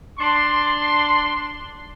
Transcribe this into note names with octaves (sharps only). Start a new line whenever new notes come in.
D4 C6